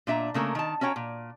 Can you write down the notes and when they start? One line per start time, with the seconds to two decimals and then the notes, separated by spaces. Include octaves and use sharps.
0.07 A#2 D4 E5 A#5
0.34 C#3 A3 A#3 A#4
0.55 D#3 A5
0.81 C#4 F#4 C#5 G5 A#5
0.96 A#2